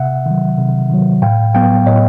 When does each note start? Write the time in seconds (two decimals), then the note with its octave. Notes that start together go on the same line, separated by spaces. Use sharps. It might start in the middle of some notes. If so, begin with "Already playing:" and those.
Already playing: C3 E5 F#5
0.26 D#3 F#3
0.58 C3
0.90 D#3 F#3
1.22 A2 F5 G5
1.54 F#3 B3 F5 G5
1.86 A2 C#5 D#5